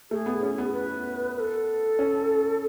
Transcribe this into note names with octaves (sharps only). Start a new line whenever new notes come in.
A3 G#4
B3
C#4
B3
B4
B4
A4
C#4